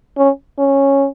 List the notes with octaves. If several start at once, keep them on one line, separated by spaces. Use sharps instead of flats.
C#4
C#4